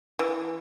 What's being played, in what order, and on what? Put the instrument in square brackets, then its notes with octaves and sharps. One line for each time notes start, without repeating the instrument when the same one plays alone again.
[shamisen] E3